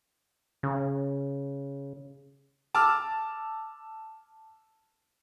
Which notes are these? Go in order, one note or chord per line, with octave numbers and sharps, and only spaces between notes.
C#3
A5 D6 E6 F6